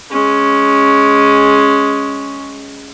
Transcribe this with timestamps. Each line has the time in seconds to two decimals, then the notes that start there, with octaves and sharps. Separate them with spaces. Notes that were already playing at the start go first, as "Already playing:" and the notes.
0.11 G#3 C#4